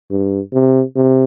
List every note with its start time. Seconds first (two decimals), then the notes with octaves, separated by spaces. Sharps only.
0.11 G2
0.53 C3
0.96 C3